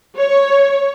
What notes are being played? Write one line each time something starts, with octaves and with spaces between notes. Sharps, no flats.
C#5